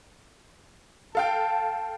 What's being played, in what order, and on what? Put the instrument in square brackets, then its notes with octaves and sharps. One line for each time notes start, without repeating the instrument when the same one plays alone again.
[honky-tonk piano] A4 F5 G5 [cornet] A5